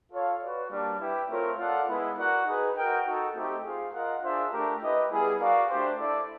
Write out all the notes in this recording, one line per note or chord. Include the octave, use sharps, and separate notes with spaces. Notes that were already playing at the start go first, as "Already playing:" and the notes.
F4 A4 C#5 F5
F#4 B4 D5
G3 A#3 D4
E4 G4 B4 E5 G5
A3 C4 F4 A#4 C#5
F4 A4 D5 F#5
G#3 B3 E4
F#4 A#4 D5 F#5
D#4 G#4 B4
F#4 A#4 D#5 G5
D#4 F#4 A4
A3 C4 D#4 G4
F4 G#4 C5 F5
F4 A#4 D#5 F#5
D4 F4 G#4 C5 E5
A3 D4 G4 A#4
E4 G4 B4 D#5
G3 B3 E4 G#4
F#4 A#4 D5 F5
A3 D4 G4 C5
E4 A4 D5